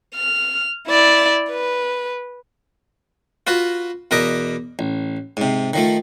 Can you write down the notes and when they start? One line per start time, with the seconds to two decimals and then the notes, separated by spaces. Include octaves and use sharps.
0.15 F6
0.88 E4 D5
1.50 B4
3.47 F4 F#4 B4
4.11 E2 B2 A#4 B4 D#5 D6
4.79 A1
5.37 G#2 C3
5.73 D#3 F3 A3